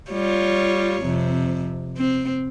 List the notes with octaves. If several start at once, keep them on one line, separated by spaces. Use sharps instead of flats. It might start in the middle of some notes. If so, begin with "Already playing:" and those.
G3 F4 C#5
F2 C3
C4